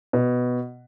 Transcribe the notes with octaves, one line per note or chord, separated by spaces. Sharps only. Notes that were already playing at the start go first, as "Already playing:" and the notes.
B2